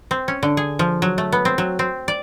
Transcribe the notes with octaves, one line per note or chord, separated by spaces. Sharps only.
C4
C#4
D3
G#4
F3
F#3
A3
B3
C4
F#3
C4
D5